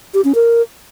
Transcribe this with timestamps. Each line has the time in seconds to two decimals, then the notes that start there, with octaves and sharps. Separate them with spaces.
0.14 G4
0.24 C#4
0.35 A#4